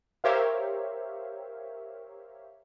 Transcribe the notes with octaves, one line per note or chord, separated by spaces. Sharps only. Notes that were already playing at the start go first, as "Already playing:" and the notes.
G4 A#4 C5 C#5 E5 F5